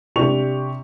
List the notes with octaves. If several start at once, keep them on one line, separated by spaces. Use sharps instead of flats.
C3 D4 G4 C#6 F7